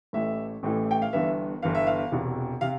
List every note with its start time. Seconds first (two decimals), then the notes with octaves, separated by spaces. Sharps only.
0.13 A1 A2 E3 A3 E5
0.63 A1 A2 E3 A3
0.91 G5
1.02 F5
1.13 G1 G2 E3 B3 E5
1.62 G1 G2 E3 B3 F5
1.75 E5
1.87 F5
2.12 E1 E2 C3
2.61 C3 F5